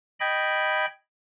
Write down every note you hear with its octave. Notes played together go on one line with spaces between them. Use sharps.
D#5 G5 B5 G#6